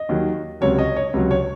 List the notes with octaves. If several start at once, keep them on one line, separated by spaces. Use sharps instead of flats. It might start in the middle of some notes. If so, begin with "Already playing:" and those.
Already playing: D#5
D#2 D#3 F#3
C#2 C3 F#3 C#5
D#5
C#5
C#2 C3 F#3
C#5